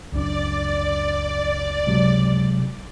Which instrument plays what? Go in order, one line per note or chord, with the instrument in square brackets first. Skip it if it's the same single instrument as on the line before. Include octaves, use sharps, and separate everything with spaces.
[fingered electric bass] C#2 F#2 D4 [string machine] D5
[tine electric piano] C3 F#3 G#3